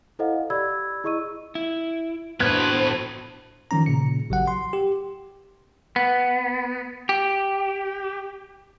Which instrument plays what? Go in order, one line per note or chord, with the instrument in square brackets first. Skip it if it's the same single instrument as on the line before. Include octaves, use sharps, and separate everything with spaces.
[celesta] E4 A4 C5 D#5 F5 F#5
G4 D5 B5 E6 G#6
E4 G#4 D#5 C#6 E6 D#7
[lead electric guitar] E4
[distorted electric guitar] A2 B4 [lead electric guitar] B3 [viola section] D4 F#4 C5 [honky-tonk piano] F#6 G#6
[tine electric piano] D#3 F3 C#4 A#5
A#2 C#3 C#7
A1 F#3 F#5
C6
G4
[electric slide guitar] B3
G4